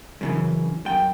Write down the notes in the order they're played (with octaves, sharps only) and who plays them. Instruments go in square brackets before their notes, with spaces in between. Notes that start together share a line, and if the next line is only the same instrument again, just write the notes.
[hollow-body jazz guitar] F#2 C#3 E3
F#2 G5